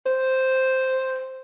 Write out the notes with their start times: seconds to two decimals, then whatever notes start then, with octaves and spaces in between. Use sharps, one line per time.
0.06 C5